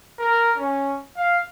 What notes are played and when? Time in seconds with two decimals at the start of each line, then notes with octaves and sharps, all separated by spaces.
0.19 A#4
0.58 C#4
1.17 F5